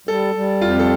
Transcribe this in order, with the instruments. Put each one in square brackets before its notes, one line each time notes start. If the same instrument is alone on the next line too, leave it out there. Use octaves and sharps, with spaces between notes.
[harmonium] G3 [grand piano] A4
[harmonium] G3
[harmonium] F2 [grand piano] F4
[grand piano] G4
A4